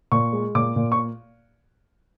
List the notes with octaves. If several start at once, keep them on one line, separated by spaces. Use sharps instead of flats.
A#2 C#6
G#3
A#2 D6
A#2
C#6